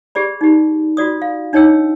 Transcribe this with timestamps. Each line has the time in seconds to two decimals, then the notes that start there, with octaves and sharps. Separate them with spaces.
0.15 G4 G#4 D5 B5
0.41 D#4 G4
0.97 F4 F#4 D5 D#6
1.22 F5
1.53 D4 D#4 C#5 D#5 G5 E6